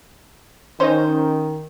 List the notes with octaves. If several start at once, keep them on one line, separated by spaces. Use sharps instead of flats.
D#3 C#4 D#4 C5